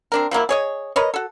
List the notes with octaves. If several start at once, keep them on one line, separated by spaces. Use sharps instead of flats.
C4 D4 A#4
F3 F#3 A#3 E4
G#4 C#5 D#5
A#4 B4 C#5 D#5
F#4 A4